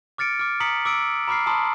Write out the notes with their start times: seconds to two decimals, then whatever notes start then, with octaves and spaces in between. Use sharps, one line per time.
0.18 D6 F6 A6 C#7 D7
0.39 D6 F6
0.60 A#5 D#6 B6 C#7 F#7
0.85 D6 E6 D7
1.28 A#5 B5 D6 F6 C7
1.46 A5 A#5 C6 D#6